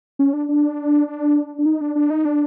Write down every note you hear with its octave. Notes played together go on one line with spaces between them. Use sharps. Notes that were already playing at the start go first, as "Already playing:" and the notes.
C#4
D4
D4
D4
D4
D#4
D4
D4
D#4
D4